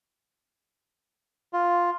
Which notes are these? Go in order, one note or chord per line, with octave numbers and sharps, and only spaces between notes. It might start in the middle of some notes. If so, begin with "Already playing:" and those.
F4